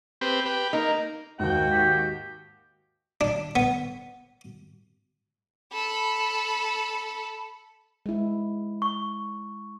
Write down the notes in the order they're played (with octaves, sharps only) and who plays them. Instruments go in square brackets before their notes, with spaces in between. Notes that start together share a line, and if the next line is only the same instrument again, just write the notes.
[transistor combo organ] C4 G4 B4
G4 B4
[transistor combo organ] A#3 [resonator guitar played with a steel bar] D#4
[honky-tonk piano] D#2 G#2 [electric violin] F#4 [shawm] G5
[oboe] G4
[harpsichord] D4
B3
[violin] A4 B5
[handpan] G#3 E4
[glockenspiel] C#6